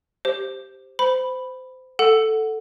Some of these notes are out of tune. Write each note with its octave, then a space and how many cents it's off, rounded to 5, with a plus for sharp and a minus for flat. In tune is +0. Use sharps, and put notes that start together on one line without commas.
G4 +0 C5 +0
C5 -25 B5 +0
A4 +0 F#5 +0